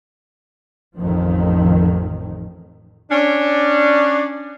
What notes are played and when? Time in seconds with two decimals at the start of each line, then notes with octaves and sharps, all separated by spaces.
0.97 A1 F2 D#3 F3
3.11 C#4 D4